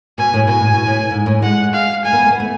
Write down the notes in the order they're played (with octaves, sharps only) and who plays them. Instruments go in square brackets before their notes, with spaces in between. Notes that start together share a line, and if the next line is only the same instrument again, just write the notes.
[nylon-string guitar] B2 [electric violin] G#5
[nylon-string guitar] A2
[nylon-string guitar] B2 [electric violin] G#5
[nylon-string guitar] A2
B2
A2
G#2
A2
[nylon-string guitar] G#3 [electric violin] F#5
[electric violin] F5
[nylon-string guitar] A3 [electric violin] G#5
[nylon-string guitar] B3
A3
B3
A3